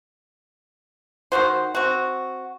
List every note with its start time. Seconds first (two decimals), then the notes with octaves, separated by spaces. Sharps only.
1.32 D#3 F#3 F#4 C5
1.75 C4 F#4